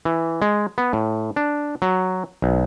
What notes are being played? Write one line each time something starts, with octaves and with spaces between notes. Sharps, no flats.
E3
G#3
B3
A2
D4
F#3
B1